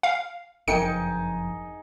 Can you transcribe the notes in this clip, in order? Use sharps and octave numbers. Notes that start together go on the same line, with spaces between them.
F5
F#1 F2 D#4 G#4 A#4 G5 C#7